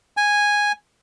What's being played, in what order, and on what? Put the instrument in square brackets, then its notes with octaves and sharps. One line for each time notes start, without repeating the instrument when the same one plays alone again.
[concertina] G#5